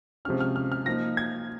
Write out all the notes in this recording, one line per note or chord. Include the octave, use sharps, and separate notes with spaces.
C3 F3 G#3 C#4 F6
F6
F6
F6
F3 A#3 D#4 A#6
G#6